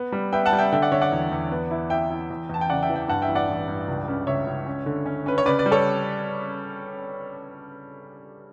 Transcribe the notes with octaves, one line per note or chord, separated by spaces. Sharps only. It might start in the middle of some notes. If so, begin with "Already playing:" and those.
Already playing: B3
G3
B3 E5 G5
F#5 A5
G3
E5 G5
D3 E5 G5
D5 F#5
D3 C#5 E5
D5 F#5
E2
E2
B3
E4
E4 E5 G5
E4
E2
E2 A5
G5
C#3 D5 F#5
E5 G5
E3
E5 G5
G2 F#5 A5
E5 G5
A1
D5 F#5
A1
G2
C#2
C#3
C#2 C#5 E5
C#2
C#4
D3
C#4
C#4 B4
C#5
C#3 B4 D5
B4 D5
G3
A4 C#5